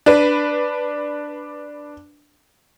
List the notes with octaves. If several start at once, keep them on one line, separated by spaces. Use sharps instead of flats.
D4 B4